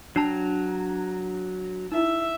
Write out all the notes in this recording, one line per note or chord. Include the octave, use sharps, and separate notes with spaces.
F#3 D4 A5 A#5
D#4 E4 E5